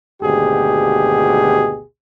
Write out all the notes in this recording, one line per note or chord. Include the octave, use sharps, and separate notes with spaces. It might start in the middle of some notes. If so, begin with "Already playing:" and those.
G#1 D2 B2 G4 G#4